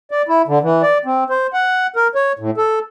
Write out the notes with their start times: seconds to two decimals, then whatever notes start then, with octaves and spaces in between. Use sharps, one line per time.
0.11 D5
0.28 E4
0.48 D3
0.63 E3
0.82 D5
1.05 C4
1.30 C5
1.53 F#5
1.96 A#4
2.15 C#5
2.39 A2
2.58 A4